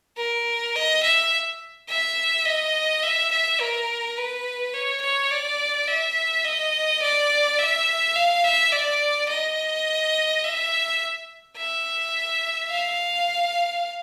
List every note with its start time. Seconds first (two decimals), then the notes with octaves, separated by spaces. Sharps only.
0.17 A#4
0.76 D#5
1.03 E5
1.89 E5
2.45 D#5
3.03 E5
3.31 E5
3.60 A#4
4.17 B4
4.74 C#5
5.02 C#5
5.31 D5
5.88 E5
6.44 D#5
7.02 D5
7.59 E5
8.16 F5
8.44 E5
8.72 D5
9.29 D#5
10.44 E5
11.57 E5
12.71 F5